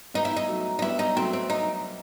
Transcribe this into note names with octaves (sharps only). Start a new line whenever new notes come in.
G3 B3 D#4
E4
D#4
F#3 A3
D#4
G3 B3 E4
D#4
F#3 A3 C4
C4
D#4